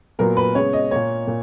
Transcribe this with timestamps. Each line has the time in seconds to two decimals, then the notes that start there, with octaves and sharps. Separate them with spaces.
0.19 A#2 F#3 B3 A#4
0.37 B4
0.55 C#3 G#3 B3 C#5
0.73 D#5
0.91 A#2 A#3 C#5
1.27 A#2